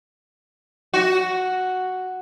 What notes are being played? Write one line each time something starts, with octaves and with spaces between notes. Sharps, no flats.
F#4